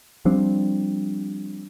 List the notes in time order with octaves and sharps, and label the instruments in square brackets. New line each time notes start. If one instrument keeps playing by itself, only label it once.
[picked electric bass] F3 G3 C4 D4